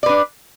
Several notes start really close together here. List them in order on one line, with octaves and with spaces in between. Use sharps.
D5 B4 D4